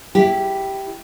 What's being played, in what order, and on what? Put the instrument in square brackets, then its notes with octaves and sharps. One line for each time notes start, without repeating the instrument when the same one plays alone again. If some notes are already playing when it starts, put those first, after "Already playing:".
[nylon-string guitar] E4 G4